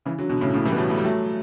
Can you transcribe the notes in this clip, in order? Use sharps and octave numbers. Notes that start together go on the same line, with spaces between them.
C#3 E3
D3 F#3
B2 D3
A2 C#3
A2 C#3
E3 G3
B3
F#3 A3
A3
G3
F#3 A3